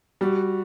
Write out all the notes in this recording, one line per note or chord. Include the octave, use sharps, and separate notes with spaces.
G3 F#4